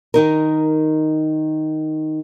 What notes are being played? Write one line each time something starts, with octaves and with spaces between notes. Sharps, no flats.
D#3 D#4 A#4